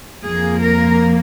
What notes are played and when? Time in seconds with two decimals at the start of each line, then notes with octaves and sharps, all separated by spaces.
0.23 F2 F3 A#3 G#4
0.62 A#4